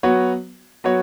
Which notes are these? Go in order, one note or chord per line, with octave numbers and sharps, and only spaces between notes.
F#3 B3 F#4 C#5
F#3 B3 F#4 C#5